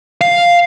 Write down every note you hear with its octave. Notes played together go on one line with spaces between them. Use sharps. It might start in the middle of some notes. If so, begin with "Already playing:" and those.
F5